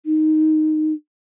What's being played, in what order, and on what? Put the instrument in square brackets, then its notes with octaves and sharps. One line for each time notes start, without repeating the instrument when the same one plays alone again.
[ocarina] D#4